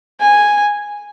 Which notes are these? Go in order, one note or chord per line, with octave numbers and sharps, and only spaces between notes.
G#5